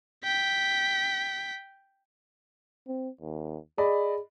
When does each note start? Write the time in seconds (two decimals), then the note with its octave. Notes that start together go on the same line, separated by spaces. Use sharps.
0.24 G5 B6
2.87 C4
3.21 D#2
3.78 G#4 D5 D#5 B5